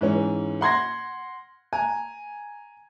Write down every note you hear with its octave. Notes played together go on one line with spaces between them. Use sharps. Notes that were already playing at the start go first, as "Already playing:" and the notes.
G#2 E3 C#4
F#5 C6 G#6 A#6
G#5 A#5